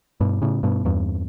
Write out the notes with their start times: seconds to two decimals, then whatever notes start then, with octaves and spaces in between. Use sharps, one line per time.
0.21 G2 B2
0.42 A2 C#3
0.63 G2 B2
0.85 E2 G2